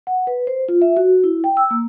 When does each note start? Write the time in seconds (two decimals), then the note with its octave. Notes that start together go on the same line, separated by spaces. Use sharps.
0.07 F#5
0.27 B4
0.47 C5
0.69 F4
0.82 E5
0.97 F#4
1.24 E4
1.44 G5
1.57 E6
1.71 A#3